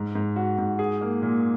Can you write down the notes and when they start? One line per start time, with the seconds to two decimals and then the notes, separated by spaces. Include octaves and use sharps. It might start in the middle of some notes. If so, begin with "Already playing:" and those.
Already playing: G#2
0.15 G#2
0.36 F#4
0.58 G#2
0.79 G#4
1.01 A#3
1.22 A#2